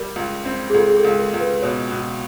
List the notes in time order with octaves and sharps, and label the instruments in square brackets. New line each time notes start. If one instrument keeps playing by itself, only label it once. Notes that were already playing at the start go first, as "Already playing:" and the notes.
Already playing: [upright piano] G3 [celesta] A#4
[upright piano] C#2
C4
[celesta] G#4
[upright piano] C#2 [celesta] A4
[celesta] G#4
A4
[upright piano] C#2
[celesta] A#4
[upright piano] C#2
[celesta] B4
[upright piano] B2 [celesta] C#5
[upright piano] B2